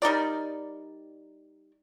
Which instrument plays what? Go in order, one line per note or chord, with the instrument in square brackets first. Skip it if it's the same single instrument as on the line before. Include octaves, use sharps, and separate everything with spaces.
[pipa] G3 D#4 A#4 D5